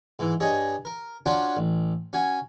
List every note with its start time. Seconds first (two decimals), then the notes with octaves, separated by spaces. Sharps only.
0.19 G#2 E3
0.40 G2 G#4 C#5 D#5
0.85 A#4
1.26 C#4 D4 F4 F#4 C#5 F#5
1.57 A1
2.13 C#4 F#4 G#5